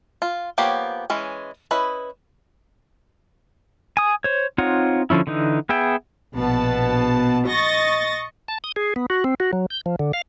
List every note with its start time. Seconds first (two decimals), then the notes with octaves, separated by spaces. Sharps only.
0.22 F4
0.58 F3 A#3 B3 G4 C#5
1.10 E3 G#3 C#4
1.71 C#4 E4 B4 D#5
3.97 G#5 D#6
4.24 C5 C#5
4.58 C4 D#4 F4 C#5 F#5
5.10 D3 F3 C#4 E4
5.27 D3 E3 D#4
5.69 B3 G#4 E5 G5
6.35 A#1 B2 B3 A5
7.48 D#5 C#6 A6 A#6
8.48 A5
8.64 D#6
8.76 G#4
8.96 B3
9.10 F#4
9.24 C4
9.40 F#4
9.53 F#3
9.70 G6
9.86 F3
9.99 D3
10.13 F5